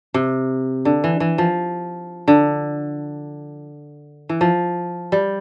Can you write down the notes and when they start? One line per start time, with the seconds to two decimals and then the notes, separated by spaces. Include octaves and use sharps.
0.14 C3
0.85 D3
1.04 E3
1.20 E3
1.38 F3
2.28 D3
4.29 E3
4.41 F3
5.12 G3